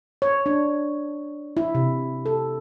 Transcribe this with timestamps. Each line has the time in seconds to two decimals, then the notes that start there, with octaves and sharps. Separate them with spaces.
0.22 C#5
0.46 D4
1.57 E4
1.75 C3
2.26 A4